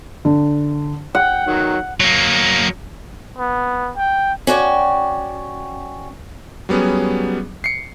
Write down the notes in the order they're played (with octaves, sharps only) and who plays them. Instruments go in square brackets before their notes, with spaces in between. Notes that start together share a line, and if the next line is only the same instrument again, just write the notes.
[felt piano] D3
[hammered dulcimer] F#5 [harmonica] G5
[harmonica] D#3 F#3
[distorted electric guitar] F#3 A#3
[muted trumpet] B3
G5
[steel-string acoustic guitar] C#4 F#4 D5 G5
[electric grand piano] F#3 G3 B3 C#4 G#4
C7 C#7